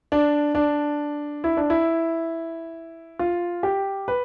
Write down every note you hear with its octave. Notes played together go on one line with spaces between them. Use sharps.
D4
D4
E4
D4
E4
F4
G4
B4